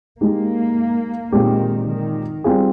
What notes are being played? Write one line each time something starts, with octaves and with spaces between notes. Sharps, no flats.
G#3 A#3 D#4 G4
A#2 D#3 G#3 C4 G4
D#3
G3 C4 F4 G#4